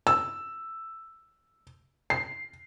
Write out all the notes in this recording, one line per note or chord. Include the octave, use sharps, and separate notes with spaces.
E6
C7